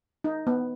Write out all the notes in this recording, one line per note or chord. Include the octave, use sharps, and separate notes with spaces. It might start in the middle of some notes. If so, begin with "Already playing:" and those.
D#4
B3